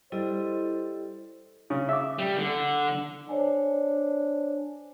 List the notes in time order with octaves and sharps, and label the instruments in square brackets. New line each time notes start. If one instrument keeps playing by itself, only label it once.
[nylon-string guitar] G3 [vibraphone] E4 A4 D#5 [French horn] C5
[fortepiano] C#3
E5 D6
[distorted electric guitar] G3
D3
[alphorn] D4 [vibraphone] C5 C#5 G#5